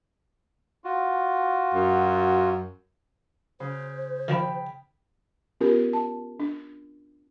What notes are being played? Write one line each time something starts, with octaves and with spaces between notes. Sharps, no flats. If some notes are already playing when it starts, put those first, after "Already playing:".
F4 F#4
F#2
C#3 C5
D#3 F3 D4 G5 B5
B3 C#4 F4 G4 A#4
A5
D4